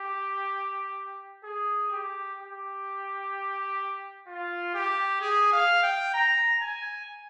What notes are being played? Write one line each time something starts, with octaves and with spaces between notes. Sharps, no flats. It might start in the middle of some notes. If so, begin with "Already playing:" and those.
Already playing: G4
G#4
G4
G4
F4
G4
G#4
F5
G5
A#5
G#5